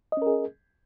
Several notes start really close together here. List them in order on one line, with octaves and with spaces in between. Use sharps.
D#5 C#4 A#4 G#4